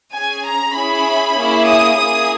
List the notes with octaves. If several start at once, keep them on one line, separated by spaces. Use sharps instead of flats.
C#4 G#4 G#5
A#5
C#4 E4 G#4 B5
A#3 C#4 E4 G#4
D#6
A#3 E4 G#4 D#6